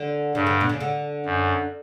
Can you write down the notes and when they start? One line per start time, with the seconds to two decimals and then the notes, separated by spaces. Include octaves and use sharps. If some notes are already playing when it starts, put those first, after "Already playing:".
Already playing: D3
0.35 G2 C#3
0.46 D3
0.61 B2
0.69 C#3
0.80 D3
1.26 F#2